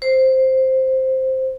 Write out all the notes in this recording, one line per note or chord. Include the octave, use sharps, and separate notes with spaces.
C5